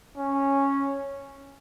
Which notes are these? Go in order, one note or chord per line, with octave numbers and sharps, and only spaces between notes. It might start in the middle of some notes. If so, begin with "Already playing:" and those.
C#4